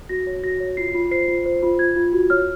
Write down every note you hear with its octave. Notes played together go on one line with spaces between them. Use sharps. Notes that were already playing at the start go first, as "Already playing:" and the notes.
F#4 A#6
C#5
F#4 A#6
C#5
F4 C7
F4
C5 C7
F4
C5
F4
F4 G#6
F4
F#4
C#5 F6